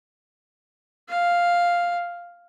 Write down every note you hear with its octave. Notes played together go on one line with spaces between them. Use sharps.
F5